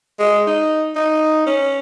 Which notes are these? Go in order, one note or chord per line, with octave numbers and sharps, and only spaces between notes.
G#3
D#4
D#4
C#4